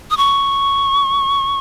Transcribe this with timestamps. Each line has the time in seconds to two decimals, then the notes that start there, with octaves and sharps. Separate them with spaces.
0.10 D#6
0.17 C#6